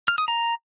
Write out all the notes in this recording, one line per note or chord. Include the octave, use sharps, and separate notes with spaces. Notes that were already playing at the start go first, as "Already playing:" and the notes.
F6
D#6
A#5